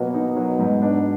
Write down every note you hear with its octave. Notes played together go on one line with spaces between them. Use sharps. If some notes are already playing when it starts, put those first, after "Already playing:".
Already playing: B2 F#3 A#3
D#4
F#3
G#2
D4